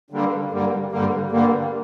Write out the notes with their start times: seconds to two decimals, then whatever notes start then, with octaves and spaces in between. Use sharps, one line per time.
0.10 G2 D3 G3 A#3
0.51 G2 D3 G3 A#3
0.91 G2 D3 G3 A#3
1.31 G2 D3 G3 A#3